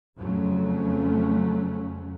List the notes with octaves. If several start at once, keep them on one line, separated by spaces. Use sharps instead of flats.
F2 C#3 F#3 A3 C#4